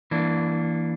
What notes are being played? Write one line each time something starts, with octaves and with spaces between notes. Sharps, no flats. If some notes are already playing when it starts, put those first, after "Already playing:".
E3 A#3 D4